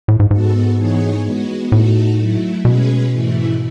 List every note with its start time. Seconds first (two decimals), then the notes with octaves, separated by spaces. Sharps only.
0.08 A2
0.20 G#2
0.31 G#2 G#3 B3 F#4 A4
0.78 E3 B3 D#4 G#4 C#5
1.25 G#3 B3 F#4
1.72 A2 A3 D#4 F#4 A4
2.18 F#3 A3 E4
2.65 B2 G#3 C#4 G#4 B4
3.12 G#2 E3 A3 E4